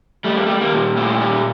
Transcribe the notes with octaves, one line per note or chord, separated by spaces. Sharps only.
G3 A3
A#3
G3 A3
A#3
A#2
A#2 A3
G3